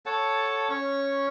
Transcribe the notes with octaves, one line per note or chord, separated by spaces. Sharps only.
A4 C#5 F#5 A5
C#4 C#5 C#6